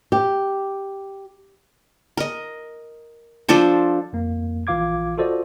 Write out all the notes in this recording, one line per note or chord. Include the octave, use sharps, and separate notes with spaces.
G4
A#4 D#5
F3 D4 A4 C5
F2 A#3
A#1 E3 F4 F5 D6 G#6
F4 F#4 A4 C5 D5 D#5